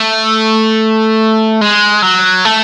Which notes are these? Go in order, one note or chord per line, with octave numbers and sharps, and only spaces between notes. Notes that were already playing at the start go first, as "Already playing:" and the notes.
Already playing: A3
G#3
F#3
A3